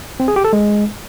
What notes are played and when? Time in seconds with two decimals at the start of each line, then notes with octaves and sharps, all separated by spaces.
0.20 C4
0.28 G#4
0.36 G4
0.44 A4
0.53 G#3